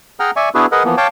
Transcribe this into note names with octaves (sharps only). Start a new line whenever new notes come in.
G#4 F#5 G5 A#5 F6
D5 E5 G#5 C#6
B3 D4 E4 F#4 G#4 B4
G#4 A#4 B4 D#5 F#5
E3 F3 A#3 B3
C#5 F5 G5 A5 D6